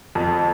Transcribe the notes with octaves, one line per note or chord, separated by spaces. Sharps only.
F2